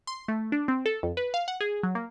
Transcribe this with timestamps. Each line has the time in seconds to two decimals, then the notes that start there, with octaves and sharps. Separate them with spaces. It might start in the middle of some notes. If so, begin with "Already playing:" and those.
0.07 C6
0.28 A3
0.52 D4
0.68 C4
0.86 A4
1.03 F2
1.17 B4
1.34 F5
1.48 F#5
1.61 G#4
1.83 F#3
1.95 A#3